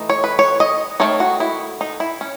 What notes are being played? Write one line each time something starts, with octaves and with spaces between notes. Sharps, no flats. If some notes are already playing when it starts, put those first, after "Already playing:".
Already playing: E3 A3 D#4
C#5
B4
C#5
D#5
D#3 A3 D#4 C#5
F#4
E4
D#4
E4
C#4